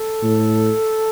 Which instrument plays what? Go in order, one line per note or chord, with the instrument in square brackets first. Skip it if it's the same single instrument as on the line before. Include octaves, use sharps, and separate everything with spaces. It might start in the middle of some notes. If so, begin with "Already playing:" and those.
Already playing: [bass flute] A4
[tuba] A2